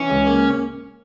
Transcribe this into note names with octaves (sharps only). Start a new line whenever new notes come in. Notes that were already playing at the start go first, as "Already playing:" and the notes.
Already playing: E3 C#4
C#2
A#3